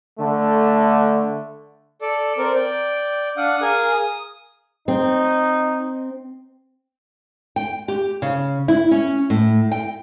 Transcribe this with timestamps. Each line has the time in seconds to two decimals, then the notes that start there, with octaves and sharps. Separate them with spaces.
0.19 D3 A3
2.02 A4 D5
2.38 C4 A#4 D5
2.55 D5 G5
3.37 D4 F5 F#5 D#6
3.62 G#4 A#4 F5 G#5 D#6
3.94 D#6
4.88 C4 D#4
7.56 G5
7.88 G4
8.22 C#3
8.68 E4
8.91 C#4
9.30 A2
9.72 G5